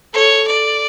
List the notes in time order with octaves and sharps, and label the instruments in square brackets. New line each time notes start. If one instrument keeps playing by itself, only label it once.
[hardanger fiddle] A4 [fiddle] C#5
[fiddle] D5